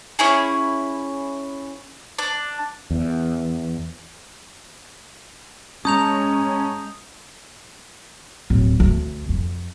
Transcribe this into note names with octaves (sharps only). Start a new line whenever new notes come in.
C#4 E4 G#4
D4
E2
G#3 C#4 A5 A#5 D#6 G6 F7
D1
D2
F2